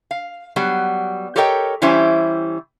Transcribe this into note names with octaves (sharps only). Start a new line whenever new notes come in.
F5
F#3 G3 B3
G4 A4 A#4 C#5 D#5 G5
E3 G3 C#4 E4 G4 C5